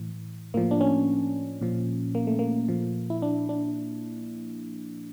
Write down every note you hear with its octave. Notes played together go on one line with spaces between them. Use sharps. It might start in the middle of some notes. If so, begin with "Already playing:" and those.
Already playing: A2 E3
A2 F3 A#3
D4
C#4
A#2 F3
A#3
A3
A#3
A#2 F3
E4
D4
D4